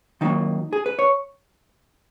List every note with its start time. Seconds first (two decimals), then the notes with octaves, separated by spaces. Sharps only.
0.21 D#3 F#3 A#3 D#4
0.73 G#4
0.86 B4
0.99 C#5